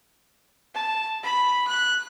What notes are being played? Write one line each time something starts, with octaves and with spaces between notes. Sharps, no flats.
A5
B5
F#6